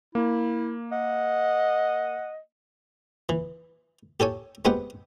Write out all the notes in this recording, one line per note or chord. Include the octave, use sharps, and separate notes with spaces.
A#3 E4
D#5 F#5
E3
G4 A4 C#5 G#5
G#3 B3 C4 G4 F#5